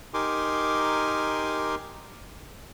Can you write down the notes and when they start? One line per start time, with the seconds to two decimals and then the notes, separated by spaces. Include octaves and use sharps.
0.14 D#4 G4 A#4 G#5 C6 D6